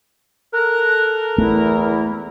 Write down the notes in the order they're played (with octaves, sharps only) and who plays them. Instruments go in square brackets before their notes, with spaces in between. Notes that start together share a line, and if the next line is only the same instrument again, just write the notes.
[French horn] A4 [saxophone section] A#4 [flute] F#6
[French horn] E2 [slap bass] A3 [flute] E4